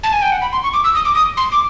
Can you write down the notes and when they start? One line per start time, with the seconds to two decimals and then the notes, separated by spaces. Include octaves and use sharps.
0.03 A5
0.13 G#5
0.22 G5
0.32 F#5
0.42 B5
0.52 C6
0.63 C#6
0.74 D6
0.84 E6
0.95 D#6
1.05 D6
1.15 D#6
1.37 C6
1.52 D6